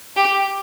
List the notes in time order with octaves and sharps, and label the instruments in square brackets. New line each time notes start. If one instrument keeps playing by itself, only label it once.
[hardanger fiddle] G4